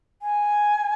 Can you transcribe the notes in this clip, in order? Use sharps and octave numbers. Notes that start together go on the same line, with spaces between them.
G#5